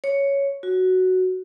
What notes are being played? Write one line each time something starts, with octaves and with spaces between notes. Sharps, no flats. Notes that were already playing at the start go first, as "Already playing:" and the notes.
C#5
F#4